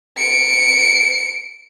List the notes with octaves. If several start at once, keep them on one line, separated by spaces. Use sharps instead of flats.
C#7 D7